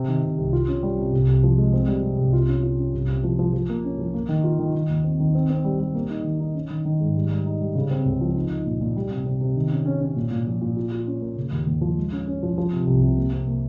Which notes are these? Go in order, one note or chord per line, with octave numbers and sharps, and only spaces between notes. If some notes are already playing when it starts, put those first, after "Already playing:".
Already playing: C3
D#3
C3
C2
F4
C#4
G3
C3
C2
C2
F3
G#3
C4
G3
C3
C2
F4
C#4
F4
C#4
C2
C3
F3
F3
F3
A#3
C#4
F3
A#3
D#3
F4
D#3
D#3
D#2
C4
D#3
C4
C4
G3
G3
A#3
D#4
D#3
D#4
C#4
D#3
D#3
G#2
G3
G3
D#4
G3
C#3
C4
C#2
F3
D#4
D#4
A#2
A#2
G3
C3
C3
C3
D#3
C#4
C#4
C#4
A#2
A#2
F3
A#2
F4
F4
C#4
A#3
C#3
D#2
D#2
F3
G#3
C#4
C#4
F3
F3
C3
C2
C3
A#3
C3
A#3